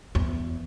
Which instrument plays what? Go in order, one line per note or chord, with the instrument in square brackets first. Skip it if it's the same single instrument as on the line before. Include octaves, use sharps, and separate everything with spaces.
[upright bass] E2